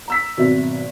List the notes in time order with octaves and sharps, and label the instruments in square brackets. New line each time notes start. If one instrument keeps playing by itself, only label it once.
[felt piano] A#5 E6 B6
[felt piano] G#1 E5 [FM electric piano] B2 F#3